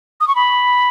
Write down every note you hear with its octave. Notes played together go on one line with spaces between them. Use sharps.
D#6
C#6
B5